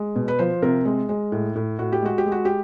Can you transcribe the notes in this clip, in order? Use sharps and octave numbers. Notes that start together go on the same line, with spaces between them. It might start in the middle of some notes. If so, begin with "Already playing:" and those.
Already playing: G#3
B2
B4
F3 C5
C3 A#4
G#3
G#3
A2
A2
A2 F#4
G4
G#3 F#4
G4
G#3
F#4
G4